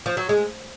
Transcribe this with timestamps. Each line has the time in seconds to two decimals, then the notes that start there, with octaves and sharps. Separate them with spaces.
0.06 F3
0.17 F#3
0.29 G#3